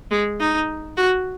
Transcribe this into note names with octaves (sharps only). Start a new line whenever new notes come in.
G#3
D#4
F#4